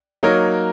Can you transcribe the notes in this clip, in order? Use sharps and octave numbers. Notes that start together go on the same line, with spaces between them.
F#3 A#3 D#4 A#4 C#5